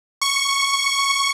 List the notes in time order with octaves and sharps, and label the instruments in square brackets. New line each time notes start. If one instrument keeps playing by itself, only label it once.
[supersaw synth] C#6